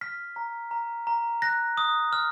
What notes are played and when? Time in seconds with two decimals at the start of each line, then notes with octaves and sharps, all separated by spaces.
0.01 F6 B6
0.36 A#5
0.71 A#5
1.07 A#5
1.42 F#6 A#6
1.77 D#6
2.13 F6